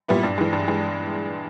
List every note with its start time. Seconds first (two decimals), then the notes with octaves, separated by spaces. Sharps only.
0.08 A#2 G3 B3 E4
0.23 G2
0.38 E3 G#3
0.53 G2
0.68 E3 G#3